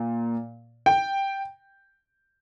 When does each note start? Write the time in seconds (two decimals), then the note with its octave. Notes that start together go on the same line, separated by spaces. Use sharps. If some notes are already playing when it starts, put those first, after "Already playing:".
Already playing: A#2
0.86 G5